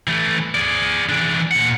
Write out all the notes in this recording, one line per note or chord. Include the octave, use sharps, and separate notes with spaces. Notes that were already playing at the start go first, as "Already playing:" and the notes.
E3 A3
G#4 D5
E3 D4
A#2 F#5